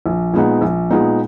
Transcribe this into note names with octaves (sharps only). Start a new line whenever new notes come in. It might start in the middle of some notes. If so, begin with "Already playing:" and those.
A#1
A#2 G#3 B3 D#4
A#1
A#2 G#3 B3 D#4